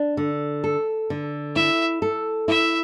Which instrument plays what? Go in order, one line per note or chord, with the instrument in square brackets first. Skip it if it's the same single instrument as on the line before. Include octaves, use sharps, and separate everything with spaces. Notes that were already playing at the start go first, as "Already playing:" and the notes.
Already playing: [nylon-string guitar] D4
D3
A4
D3
[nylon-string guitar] E4 [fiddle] E5
[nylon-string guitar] A4
[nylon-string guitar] E4 [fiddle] E5